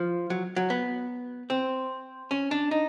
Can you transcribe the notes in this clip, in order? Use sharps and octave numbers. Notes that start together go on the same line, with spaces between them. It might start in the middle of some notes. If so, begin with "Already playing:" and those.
Already playing: F3
F#3
F#3
B3
C4
C#4
D4
D#4